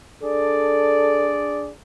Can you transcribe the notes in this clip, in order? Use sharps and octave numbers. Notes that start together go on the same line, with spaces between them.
D4 G#4 A4 D5